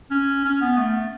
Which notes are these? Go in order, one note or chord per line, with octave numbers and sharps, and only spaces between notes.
C#4
C#4
B3
A3